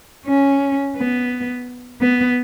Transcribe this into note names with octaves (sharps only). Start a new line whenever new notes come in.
C#4
B3
B3